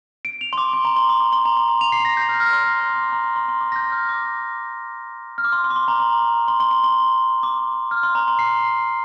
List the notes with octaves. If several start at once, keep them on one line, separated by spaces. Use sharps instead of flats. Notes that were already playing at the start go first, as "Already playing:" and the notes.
D7
F7
C6
D6
C6
A#5
C6
D6
D6
C6
A#5
C6
D6
F7
C7
A#6
G6
F6
F6
C6
F6
C6
D6
C6
A#5
C6
C6
C6
D6
A#6
G6
F6
D6
F6
D6
C6
C6
D6
C6
A#5
A#5
C6
C6
C6
C6
D6
F6
C6
A#5
C6
C7